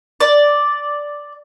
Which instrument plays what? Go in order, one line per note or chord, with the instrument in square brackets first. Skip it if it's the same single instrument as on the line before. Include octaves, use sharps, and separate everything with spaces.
[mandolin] D5